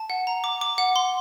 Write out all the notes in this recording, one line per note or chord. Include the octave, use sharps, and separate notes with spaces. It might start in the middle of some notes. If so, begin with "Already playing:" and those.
Already playing: A5
F#5
A#5
D6
D6
F#5
C6